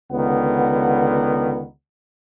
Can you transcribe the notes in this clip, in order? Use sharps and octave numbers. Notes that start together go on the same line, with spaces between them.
C#2 D3 D#3 B3 F#5